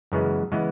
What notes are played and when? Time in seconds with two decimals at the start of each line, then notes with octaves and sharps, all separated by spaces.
0.12 F#2 C#3 E3 G#3 B3
0.52 C#3 E3 G#3 B3